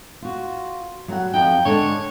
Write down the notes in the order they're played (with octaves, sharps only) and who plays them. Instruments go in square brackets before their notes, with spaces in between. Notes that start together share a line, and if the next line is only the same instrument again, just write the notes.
[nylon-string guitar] F4 F#4
F#3 G3 F#5
[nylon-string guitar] F2 D#4 [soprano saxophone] G5
[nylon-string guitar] D3 G#3 D4 [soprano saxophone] C#5